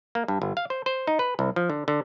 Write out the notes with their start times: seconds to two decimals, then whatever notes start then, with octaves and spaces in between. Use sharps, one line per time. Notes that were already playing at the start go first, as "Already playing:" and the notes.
0.15 A#3
0.28 G2
0.42 G1
0.57 F5
0.70 C5
0.86 C5
1.07 D#4
1.19 B4
1.39 C2
1.56 F3
1.70 D3
1.88 D3